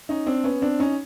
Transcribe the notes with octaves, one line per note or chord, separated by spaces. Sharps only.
C#4 D#4
C4 D4
B3 C#4
C4 D4
C#4 D#4